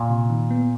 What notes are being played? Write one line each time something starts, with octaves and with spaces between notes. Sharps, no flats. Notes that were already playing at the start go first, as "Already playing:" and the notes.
Already playing: A#2
C3
D#3
B3